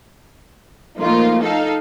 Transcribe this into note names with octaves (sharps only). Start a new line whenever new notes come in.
F3 A3 A#3 D#4 F4
D#4 A4 F5